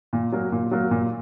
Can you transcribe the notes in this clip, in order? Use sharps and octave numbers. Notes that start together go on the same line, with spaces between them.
A#2
F#3 A#3
A#2
F#3 A#3
A#2